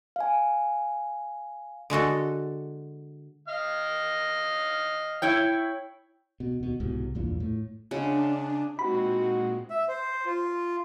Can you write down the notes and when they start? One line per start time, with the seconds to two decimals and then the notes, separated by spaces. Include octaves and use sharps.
0.16 F5 G#5
1.90 D3 G#3 F#4 A4
3.48 D#5 F5 F6
5.22 E4 C#5 G5
6.40 B2
6.60 D#2 B2
6.80 C2 G#2 B2
7.15 A#1 E2 G2 A#2
7.40 A2
7.91 C#3 G#3 D4 F#5
8.79 A#2 G#3 C4 D#4 F#4 B5
9.70 E5
9.88 C5
10.26 F4